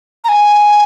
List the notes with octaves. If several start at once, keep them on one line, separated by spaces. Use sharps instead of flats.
A#5
G#5